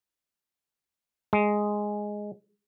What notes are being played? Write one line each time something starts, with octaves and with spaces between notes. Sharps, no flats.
G#3